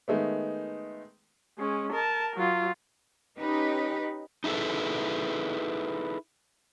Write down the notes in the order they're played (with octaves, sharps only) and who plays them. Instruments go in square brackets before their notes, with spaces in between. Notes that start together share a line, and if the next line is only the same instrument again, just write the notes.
[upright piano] D#3 G#3 A3 B3
[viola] G#3 C#4
A#4 A5
F#3 F4
[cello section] C#4 D#4 G4 B4
[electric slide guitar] D#4 E4 G#4 A4 B4